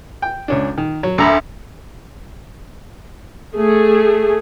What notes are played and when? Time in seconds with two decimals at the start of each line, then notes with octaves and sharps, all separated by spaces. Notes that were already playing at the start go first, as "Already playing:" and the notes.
0.22 G5
0.48 C#2 C#4 D4
0.78 D#3
1.03 F#3
1.18 D2 E5 A#5 B5
3.58 A3 G#4